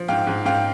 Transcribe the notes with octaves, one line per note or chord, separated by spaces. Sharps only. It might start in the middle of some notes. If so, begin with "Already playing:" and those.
Already playing: F3
G#2 F5 G5
G#2
G#2 F5 G5